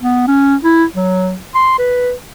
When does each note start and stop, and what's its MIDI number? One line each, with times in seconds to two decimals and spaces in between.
0.02 0.27 59
0.27 0.56 61
0.63 0.85 64
0.95 1.37 54
1.55 1.76 84
1.79 2.12 71